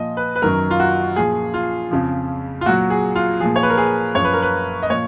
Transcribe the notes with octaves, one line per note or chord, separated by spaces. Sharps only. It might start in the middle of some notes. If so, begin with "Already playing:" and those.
Already playing: A#2 F3 D#5
B4
B4
F#2 D#3 F#3 A#4
F4
F#4
A#2 F3 G#4
F4
F2 C#3 F3
F4
A#2 F#3 F#4
G#4
F4
A#2 F3 G#4
C#5
B4
A#4
G#4
F#2 F3 C#5
B4
A#4
B4
D#5
A#2 F3 C#5